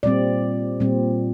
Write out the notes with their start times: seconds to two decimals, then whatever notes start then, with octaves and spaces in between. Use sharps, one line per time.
0.03 A#2 G3 C4 D5
0.80 A#2 G3 C4